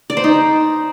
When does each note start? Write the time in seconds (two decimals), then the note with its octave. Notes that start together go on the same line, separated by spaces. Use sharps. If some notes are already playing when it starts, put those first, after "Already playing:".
0.10 D5
0.17 C5
0.24 D#4